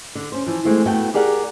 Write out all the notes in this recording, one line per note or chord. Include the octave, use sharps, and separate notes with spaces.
D3
C#4 C5
E3 F3
E3 G#3 A3 C4
A3 B3 E4 F#4 G5
G4 G#4 A#4 D5 F#5